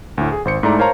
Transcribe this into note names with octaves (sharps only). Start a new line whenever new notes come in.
D2 A2
G#4
G#1 C5 C#7
G#2 A3 E4 D5 A#5
A#4 C5 C#5 F5 A5 A#5